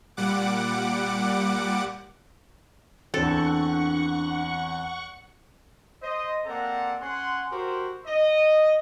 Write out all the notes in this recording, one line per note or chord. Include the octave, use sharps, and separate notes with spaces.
A#2 G3 F#5 D6
E2 C4 D4 A4 F#5 C#6
C5 D#5
A#3 C4 A4 D5 F#5 A#5
C#4 F#5 G#5 C6
F#4 G4 A#4 C5
D#5